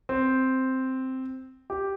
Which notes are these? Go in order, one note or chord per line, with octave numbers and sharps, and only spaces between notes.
C4
G4